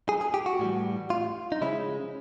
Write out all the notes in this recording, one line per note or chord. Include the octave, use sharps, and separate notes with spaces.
G#4
G#4
G4
F#4
A2 E3 G3
F4
D#4
C#3 F3 G#3 C#4 E4